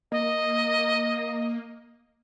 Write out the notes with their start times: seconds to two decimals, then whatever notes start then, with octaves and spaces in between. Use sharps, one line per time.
0.12 A#3 D#5